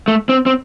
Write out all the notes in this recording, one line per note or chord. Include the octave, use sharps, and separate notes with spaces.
A3
C4
C4